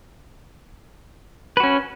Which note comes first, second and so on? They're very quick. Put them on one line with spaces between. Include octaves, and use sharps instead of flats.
B4 F#4 C#4